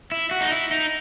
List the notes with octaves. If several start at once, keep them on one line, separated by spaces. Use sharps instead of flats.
E4
F#4
D#4
E4
D#4